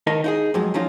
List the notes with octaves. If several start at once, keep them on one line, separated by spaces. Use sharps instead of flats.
D#3 A#4 D#5 A5
D#4 E4 G#4
F2 F3 F#3 G#3
F3 F#3 C#4 D#4 F4